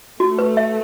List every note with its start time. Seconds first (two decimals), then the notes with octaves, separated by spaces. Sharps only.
0.20 A3 F#4
0.39 B4
0.57 E5